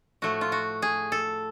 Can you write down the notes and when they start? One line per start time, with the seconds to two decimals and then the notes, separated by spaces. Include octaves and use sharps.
0.22 A2 F3 A3 F#4
0.41 F4
0.52 F#4
0.82 G#4
1.12 A4